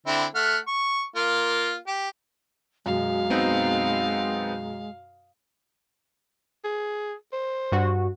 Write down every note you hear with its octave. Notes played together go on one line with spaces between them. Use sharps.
D3 C4 E4
A3 F#5 F6
C#6
A#3 F4
G4
F#2 B2 G#3 F5
B3 C4 D#4
G#4
C5
G2 F#4